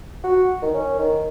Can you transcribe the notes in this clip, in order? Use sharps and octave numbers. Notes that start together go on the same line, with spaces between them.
F#4
D#3
C#4
D#3